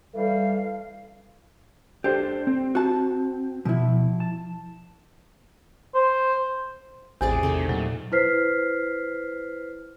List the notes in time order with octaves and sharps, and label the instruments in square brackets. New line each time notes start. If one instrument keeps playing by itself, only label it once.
[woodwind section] E3 G3 [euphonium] A4 [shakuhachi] F5
[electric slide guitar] D4 A4 C5 [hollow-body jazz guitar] G4
[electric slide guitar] C4
[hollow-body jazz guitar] F#4 A5
[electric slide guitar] B2 [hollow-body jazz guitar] F3 E4
[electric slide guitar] A5
[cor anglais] C5
[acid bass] A1 [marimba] E2 [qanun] C3 G#4 D5
[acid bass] C3 [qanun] A3 D#4
[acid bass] A#2 [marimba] F#3
[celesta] E4 B4 C5 F6 B6 C7